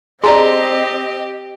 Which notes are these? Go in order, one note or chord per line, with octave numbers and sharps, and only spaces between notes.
C4 G4 G#4 D5 D#5 A5 A#5 C6